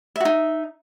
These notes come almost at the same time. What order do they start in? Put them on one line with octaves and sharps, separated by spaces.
E5 F#4 D#4